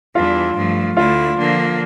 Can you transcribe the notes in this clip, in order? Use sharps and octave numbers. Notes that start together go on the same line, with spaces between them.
E2 E3 G3 D4 F4
G2 F3 A3
D2 D3 A3 E4 F4
D3 F3 A#3 D4